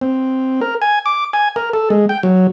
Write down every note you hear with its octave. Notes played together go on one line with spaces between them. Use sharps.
C4
A#4
G#5
D6
G#5
A#4
A4
G#3
G5
F#3